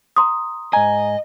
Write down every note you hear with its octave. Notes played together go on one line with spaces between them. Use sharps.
A#5 C6 D#6
G#2 D#5 G#5 A#5